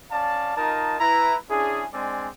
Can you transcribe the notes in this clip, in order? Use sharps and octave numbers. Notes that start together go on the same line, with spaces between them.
C#4 D5 F5 A5
D#4 F4 A#4 D#5 A5
E4 B4 A#5
C#4 D4 E4 G#4
G#3 C4 D4 G#4 D5 G#5